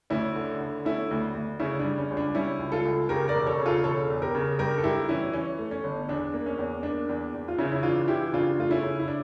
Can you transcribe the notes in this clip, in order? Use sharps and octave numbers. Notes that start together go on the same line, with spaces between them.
D2 C#4 E4
D3
D3
A3 C#4 E4
D2
D2
C#3 C#4 E4
D4
G3
C#4
C#2
D4
G3 C#4 E4
C#2
F4 A4
C#2
C#3 G4 A#4
A#4 D5
E1
A4 C#5
C#3
F4 A4
E1 A4 C#5
E2
G4 A#4
C#3
G2 G4 A#4
A4
G2 E4 G4
E3 C#4 E4
E3 C#4
A3
C#4
G1
E2 D4
A#3
C#4
E2
A#3 D4
E2
E2
F4
C#3 C#4 E4
E4
E3 D4 F4
E3 E4 G4
C#3 D4 F4
A3 F4
C#4 E4
C#3
E4
D4